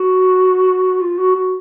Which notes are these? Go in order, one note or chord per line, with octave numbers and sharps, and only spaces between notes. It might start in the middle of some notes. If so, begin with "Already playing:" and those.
Already playing: F#4
F4
F#4
F#4